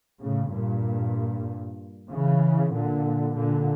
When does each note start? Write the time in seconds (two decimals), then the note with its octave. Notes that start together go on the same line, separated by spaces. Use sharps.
0.20 A2 C#3
0.52 G2 A#2
2.10 C#3 E3
2.74 A#2 D3
3.36 A#2 D3